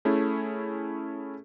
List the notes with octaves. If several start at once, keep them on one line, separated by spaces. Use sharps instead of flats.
A3 C#4 E4 G#4